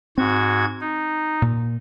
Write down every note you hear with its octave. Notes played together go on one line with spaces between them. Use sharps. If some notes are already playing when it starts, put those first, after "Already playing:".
G#2 C4 F#4 G#6
D#4
A#2